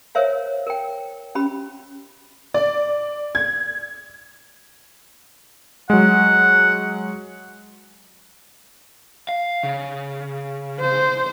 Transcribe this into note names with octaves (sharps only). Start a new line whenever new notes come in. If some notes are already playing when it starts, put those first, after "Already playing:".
A#4 C5 C#5 E5 F5
A#4 G5
C#4 G4 B5
D5
G#6
F#3 G#3 F#5
F5
C#3
C5